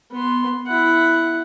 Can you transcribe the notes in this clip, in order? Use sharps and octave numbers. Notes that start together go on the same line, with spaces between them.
B3 C6
E4 F#5